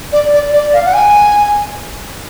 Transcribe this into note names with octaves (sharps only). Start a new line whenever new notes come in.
D5
D5
D5
F5
F#5
G#5